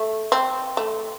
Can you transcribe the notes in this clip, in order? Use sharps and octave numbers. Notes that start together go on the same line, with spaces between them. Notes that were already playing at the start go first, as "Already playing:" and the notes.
Already playing: A3
C4
A3